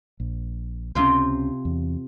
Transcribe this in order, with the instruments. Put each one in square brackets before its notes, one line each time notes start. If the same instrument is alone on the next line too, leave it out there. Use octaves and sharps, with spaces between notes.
[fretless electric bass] A#1
[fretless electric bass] C#2 F3 C#4 [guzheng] C3 F4 C5
[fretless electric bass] E2